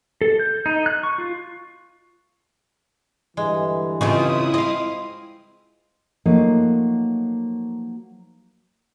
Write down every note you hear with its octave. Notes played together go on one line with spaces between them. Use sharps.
A4
G6
D#4
F#6
C#6
F4
G2 D3 E3 G#3
C#3 F3 G#3 C4 E4 D#6
C4 D#5 F5
F3 F#3 A3 A#3 D#4